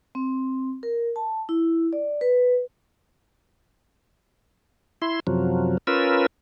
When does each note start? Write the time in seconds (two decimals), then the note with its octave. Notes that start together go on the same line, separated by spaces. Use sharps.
0.15 C4
0.83 A#4
1.16 A5
1.49 E4
1.93 D5
2.21 B4
5.02 E4 C6
5.27 F#2 C3 F3 F#3
5.87 C#4 F4 A#4 B4 E6